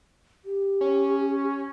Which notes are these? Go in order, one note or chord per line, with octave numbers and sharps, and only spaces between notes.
G4
C#4